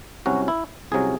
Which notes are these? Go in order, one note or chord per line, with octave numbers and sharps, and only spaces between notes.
C2 C3 F#3 C#4 F#4
E4
C2 C3 F#3 C#4 G#4